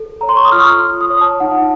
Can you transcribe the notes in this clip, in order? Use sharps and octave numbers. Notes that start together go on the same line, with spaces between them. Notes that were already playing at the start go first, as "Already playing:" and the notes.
Already playing: A4
C#5 A#5
C6
C#6
D#6
F4 F6
F4
D#6
C#5
A5
D#4 F#5